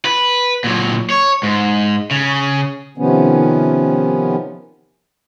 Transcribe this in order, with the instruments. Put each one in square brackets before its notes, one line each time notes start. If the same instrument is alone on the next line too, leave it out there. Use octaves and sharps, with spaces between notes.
[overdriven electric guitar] B4
A#2 F#3
C#5
G#2
C#3
[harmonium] C3 D#3 F3 B3 C#4